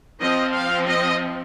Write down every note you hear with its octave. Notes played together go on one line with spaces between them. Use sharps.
F3 C4 D#5
F5
D#5